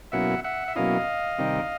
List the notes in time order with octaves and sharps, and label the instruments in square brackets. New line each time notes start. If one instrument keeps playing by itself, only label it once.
[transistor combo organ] B2 F#3 A#3 C#4 E4 E5 F#5
E5 F#5
E5
B2 F#3 A#3 C#4 E4 D#5 F5
C3 D#3 G3 C4 D#4